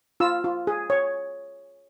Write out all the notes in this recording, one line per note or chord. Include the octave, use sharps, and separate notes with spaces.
F4 E6
F4
G#4
C#5